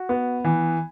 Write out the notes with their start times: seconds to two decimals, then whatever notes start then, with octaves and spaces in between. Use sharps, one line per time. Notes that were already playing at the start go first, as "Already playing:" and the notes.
Already playing: F#4
0.09 B3
0.45 E3